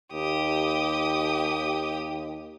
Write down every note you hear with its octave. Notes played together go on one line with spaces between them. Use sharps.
D#2 G4 D#6